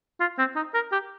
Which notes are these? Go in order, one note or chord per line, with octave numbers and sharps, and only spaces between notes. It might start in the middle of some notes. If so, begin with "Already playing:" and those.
F4
C4
D#4
A#4
G4